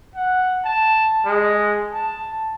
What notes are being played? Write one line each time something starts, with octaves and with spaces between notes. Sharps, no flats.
F#5
A5
G#3
A5